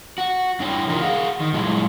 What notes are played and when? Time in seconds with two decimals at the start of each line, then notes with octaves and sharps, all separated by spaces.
0.18 F#4
0.60 G2 D4 E4 C#5 G5
0.87 C3 E3 D#4 F4 A#4
1.02 G#4 F5 F#5
1.40 D#3
1.53 G2 A#2 F#3 G#3 E4